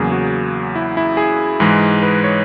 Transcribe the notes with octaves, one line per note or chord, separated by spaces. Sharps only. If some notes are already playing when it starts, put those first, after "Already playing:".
Already playing: E2 C#3 F#3 A#3 G#4
F#4
E4
E4
G#4
G#2 E3 G#3
B4
C#5